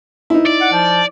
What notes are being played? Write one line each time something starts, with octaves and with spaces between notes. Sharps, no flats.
D#4 E4
D5
F#5
F3